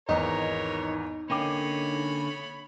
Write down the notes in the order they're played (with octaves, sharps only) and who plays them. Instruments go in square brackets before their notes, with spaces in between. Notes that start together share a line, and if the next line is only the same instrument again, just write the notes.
[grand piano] G#1 E2 [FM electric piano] D#4 [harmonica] A#4 C#5
[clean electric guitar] D3 A#3 C#4 [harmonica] C#5 B5 [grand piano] G5 D6